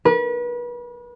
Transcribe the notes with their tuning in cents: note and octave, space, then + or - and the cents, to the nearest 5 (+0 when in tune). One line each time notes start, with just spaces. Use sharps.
B4 -35